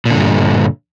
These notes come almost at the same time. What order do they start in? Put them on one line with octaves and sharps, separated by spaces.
A#2 D3 G2